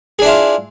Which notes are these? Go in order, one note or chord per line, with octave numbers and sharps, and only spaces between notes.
D4 E4 F4 G#4